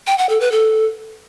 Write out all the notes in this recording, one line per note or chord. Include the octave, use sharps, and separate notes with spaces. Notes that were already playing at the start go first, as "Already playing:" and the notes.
G5
F#5
A4
B4
A4